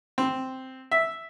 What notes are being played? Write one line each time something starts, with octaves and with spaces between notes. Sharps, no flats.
C4
E5